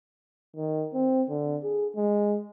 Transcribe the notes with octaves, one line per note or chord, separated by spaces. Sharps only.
D#3
C4
D3
G#4
G#3